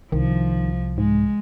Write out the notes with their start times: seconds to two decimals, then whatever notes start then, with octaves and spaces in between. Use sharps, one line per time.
0.12 C2 D#3 F3
0.98 G#2 G#3